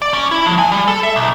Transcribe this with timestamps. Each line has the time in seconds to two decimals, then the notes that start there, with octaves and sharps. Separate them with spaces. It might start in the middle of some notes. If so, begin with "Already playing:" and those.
0.02 D5
0.13 C#4
0.31 E4
0.46 F3
0.58 G#5
0.72 G3
0.88 A4
1.03 E5
1.16 B1